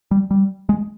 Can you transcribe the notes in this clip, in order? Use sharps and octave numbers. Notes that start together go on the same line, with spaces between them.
G3
G3
G#3